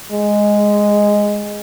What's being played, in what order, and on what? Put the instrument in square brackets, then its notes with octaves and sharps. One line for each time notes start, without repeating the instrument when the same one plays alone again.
[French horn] G#3